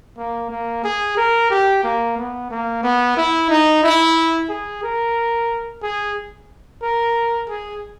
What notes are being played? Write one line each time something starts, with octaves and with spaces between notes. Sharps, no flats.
A#3
A#3
G#4
A#4
G4
A#3
B3
A#3
B3
E4
D#4
E4
G#4
A#4
G#4
A#4
G#4